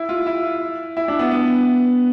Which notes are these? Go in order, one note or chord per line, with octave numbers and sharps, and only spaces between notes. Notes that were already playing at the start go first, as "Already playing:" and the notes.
Already playing: E4
F4
E4
E4
D4
B3
B3